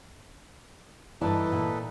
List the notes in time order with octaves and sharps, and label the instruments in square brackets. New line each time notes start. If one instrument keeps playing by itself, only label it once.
[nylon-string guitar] G2 D5 A5 [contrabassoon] E3 [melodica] D#4 A4 B4
[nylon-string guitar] A#2